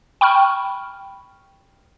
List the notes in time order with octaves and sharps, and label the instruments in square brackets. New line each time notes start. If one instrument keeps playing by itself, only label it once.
[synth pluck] G5 B5 C#6 F6